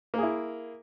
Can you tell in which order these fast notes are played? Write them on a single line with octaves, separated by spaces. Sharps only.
A#3 G#4 E4